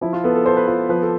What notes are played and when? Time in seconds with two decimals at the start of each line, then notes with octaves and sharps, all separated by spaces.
0.01 F3 E4
0.13 F4
0.24 B3 A4
0.35 A4
0.46 A4 C5
0.57 B4
0.67 F4 A4
0.89 F3 B4
1.02 A4